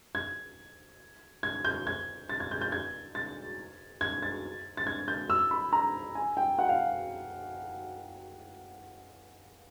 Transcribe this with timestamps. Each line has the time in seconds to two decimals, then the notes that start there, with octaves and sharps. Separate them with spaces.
0.15 G#6
1.43 G#6
1.65 G6
1.87 G#6
2.29 A6
2.40 G#6
2.51 G6
2.61 G6
2.72 G#6
3.15 A6
4.01 G#6
4.22 A6
4.77 A6
4.87 G#6
5.08 G6
5.30 E6
5.51 B5
5.73 A#5
6.15 G#5
6.37 G5
6.59 F#5
6.69 F5